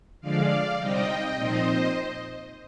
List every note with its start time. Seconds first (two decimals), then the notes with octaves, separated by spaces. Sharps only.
0.21 D3 F3 G#3 D5 F5
0.79 C3 G3 C4 D#4 D#5 G5
1.36 A#2 F3 C4 D#4 C5 D#5